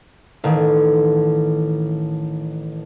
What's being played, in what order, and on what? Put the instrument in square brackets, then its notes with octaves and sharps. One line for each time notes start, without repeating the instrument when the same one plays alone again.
[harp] A1 D#3